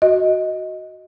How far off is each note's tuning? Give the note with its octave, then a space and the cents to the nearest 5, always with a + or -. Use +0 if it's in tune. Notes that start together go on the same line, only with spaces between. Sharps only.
F#4 +0 D#5 +10